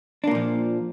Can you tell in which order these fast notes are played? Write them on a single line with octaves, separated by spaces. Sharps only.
D4 A#3 A#2 F3